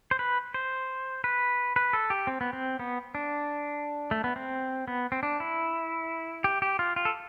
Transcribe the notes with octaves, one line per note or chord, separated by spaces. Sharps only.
C5
B4
C5
B4
B4
A4
G4
C4
B3
C4
B3
D4
A3
B3
C4
B3
C4
D4
E4
G4
G4
F4
F4
A4